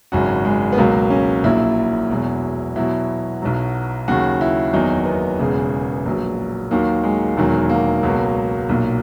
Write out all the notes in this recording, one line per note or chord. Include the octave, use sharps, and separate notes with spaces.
G#1 F#2 C#3 F#4
G#3
B3
C#2 B2 F#3 A#3
C#4
A#1 A#2 F#3 E4
E1 E2 B2 F#3
E2 B2 F#3 E4
B1 B2 F#3
D#2 C#3 F#3 F#4
E4
F#1 E2 D#3 F#3 D#4
B3
E1 E2 C#3
A#1 A#2 F#3
D#2 D#3 F#3 A#3
G#3
E1 E2 D#3 F#3
A#3
C#2 B2 F#3
B1 A#2 F#3